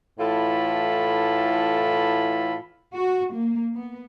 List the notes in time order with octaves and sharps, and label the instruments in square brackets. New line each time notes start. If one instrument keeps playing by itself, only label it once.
[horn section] A2 E3 F4 A4 B5
[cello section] F#4
A#3
B3